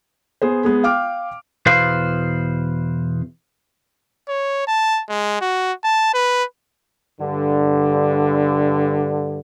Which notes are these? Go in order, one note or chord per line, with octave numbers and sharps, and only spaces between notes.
B3 G#4 C5
G#3 B3 G#4
F5 G5 D6 F6
E2 B2 B4 C5 F5
C#5
A5
G#3
F#4
A5
B4
G2 D3